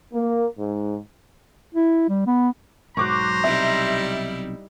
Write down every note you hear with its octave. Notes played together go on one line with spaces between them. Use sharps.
A#3
G#2
E4
G3
B3
B1 G#2 F#3 C5 A#5 C#6 D6 F#6
B1 C3 G3 D#4 E4 E5